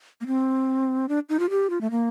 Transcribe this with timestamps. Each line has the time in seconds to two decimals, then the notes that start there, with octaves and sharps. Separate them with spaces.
0.21 A#3
0.27 C4
1.09 D4
1.29 D#4
1.39 F4
1.50 G4
1.70 F4
1.81 A3
1.91 A#3